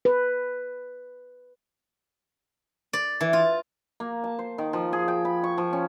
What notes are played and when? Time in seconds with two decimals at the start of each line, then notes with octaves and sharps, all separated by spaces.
0.05 B4
2.93 D5
3.21 E3
3.33 F4
4.00 A#3
4.24 A5
4.39 C5
4.58 D#3
4.73 F3
4.93 G#4
5.08 G5
5.25 B5
5.44 C#6
5.58 F3
5.73 C#4